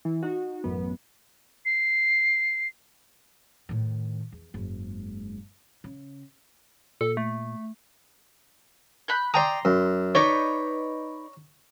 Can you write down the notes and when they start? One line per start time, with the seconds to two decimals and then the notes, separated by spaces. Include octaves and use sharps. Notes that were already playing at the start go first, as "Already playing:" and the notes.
0.05 E3
0.23 D#4 F#4
0.64 A1 F#2 B3
1.65 C7
3.69 A2 D#3
4.32 E2
4.54 F#1 G#2
5.84 C#3
7.01 A#2 A4
7.17 A3
9.08 B5 F#6 G6
9.34 D5 G5 A#5 C6 D#6
9.65 F#2
10.15 D#4 B4 C#5 D5 A#5